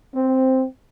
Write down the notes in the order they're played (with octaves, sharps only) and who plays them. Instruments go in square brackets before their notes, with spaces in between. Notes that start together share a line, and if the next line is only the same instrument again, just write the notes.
[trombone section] C4